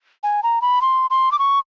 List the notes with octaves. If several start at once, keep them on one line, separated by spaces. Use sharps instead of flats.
G#5
A#5
B5
C6
C6
D6
C#6